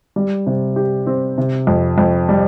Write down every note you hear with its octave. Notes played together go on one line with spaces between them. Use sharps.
G3
C3
G4
C4
C3
F2
F2
G3